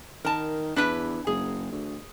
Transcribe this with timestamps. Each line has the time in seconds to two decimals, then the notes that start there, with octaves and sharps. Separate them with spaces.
0.25 D#3 A#4 A5
0.76 E2 D4 E4 B4
1.27 F#1 G#4
1.72 D2